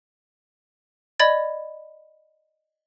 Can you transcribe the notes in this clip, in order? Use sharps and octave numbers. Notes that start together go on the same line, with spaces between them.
D5 D#5 B5 G#6 A6